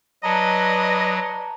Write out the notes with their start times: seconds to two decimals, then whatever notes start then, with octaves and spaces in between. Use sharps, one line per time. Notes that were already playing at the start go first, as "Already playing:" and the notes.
0.23 F#3 B4 D5 D#5 A5 A#5